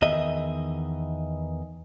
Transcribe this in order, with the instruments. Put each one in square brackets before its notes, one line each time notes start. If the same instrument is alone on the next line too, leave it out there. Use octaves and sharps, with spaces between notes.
[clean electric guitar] E2 D#3 D#5 E5